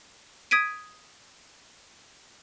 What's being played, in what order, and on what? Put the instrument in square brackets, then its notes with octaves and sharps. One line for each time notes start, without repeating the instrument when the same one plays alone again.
[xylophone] D#6 G#6 B6 D7 D#7